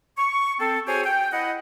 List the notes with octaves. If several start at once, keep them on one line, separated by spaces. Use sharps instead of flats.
C#6
C4 A4
F#4 G#4 C5 C#5 G5 G#5
G5
E4 D#5 F#5